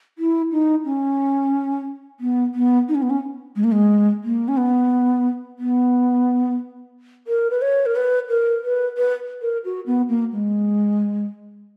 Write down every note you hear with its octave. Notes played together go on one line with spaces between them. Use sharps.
E4
D#4
C#4
B3
B3
D#4
C#4
B3
C#4
G#3
A#3
G#3
A#3
C#4
B3
B3
A#4
B4
C#5
A#4
B4
A#4
B4
B4
A#4
F#4
B3
A#3
G#3